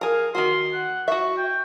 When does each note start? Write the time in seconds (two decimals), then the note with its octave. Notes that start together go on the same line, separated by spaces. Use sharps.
0.01 G#4 A#4 F5
0.35 D#3 A#3 F#4 C6
0.73 F#5
1.08 F#4 E5 C#6
1.37 G5